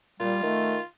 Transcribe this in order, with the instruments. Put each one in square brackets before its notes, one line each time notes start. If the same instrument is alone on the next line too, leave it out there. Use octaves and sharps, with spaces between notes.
[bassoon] A#2 [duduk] G3 [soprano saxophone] F4
[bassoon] D#3 [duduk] A3